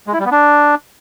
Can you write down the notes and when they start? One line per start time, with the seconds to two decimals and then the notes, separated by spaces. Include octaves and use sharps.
0.07 G#3
0.13 E4
0.19 G3
0.25 B3
0.31 D4